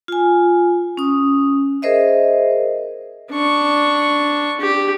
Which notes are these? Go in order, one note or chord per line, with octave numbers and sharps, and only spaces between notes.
F4 G#5
C#4 D#6
G#4 A#4 C5 D#5 E5
D4 C#6
G4